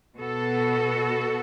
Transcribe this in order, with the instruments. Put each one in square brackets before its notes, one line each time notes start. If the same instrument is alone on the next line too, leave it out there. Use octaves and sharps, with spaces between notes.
[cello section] B2 B3 F#4 A4